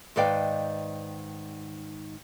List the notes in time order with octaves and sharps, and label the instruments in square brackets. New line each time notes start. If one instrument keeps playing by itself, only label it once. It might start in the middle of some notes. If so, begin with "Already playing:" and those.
[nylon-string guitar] G#2 D#3 B4 D5 F5 G5